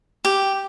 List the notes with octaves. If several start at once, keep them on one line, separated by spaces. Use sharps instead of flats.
G4